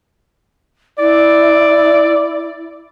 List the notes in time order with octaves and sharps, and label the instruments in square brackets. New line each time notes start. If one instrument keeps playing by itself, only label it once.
[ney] E4 [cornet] D5